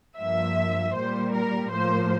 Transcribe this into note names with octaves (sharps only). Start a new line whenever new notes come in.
G2 F3 A#3 E5
A#2 G3 A#3 C5
A#4
A2 F3 A#3 C5